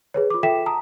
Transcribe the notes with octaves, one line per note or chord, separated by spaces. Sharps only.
G#4 B4 C#5
F4 D6
F4 A4 E5 G5 B6 E7
A5 A#5 D#6